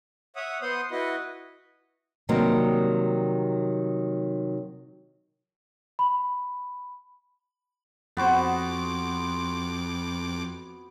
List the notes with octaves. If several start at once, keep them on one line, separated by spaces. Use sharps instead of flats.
C#5 E5 F#5 D#6
B3 C5 F#5 C6 D#6
E4 F#4 B4 D#5
C3 D#3 F#3 G3 A#3 C4
B5
F2 B3 F#4 C5 D6